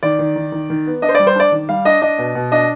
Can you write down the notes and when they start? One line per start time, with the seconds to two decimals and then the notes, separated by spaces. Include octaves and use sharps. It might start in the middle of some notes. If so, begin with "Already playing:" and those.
0.03 D#3 D5
0.19 D#3
0.36 D#3
0.52 D#3
0.70 D#3
0.86 B3
1.02 D4 D#5
1.09 C5
1.15 G3 D5
1.27 C5
1.35 D4 D5
1.52 D#3
1.69 G3 F5
1.85 D4 D#5
2.02 D4 D#5
2.18 B2
2.35 B2
2.52 D4 D#5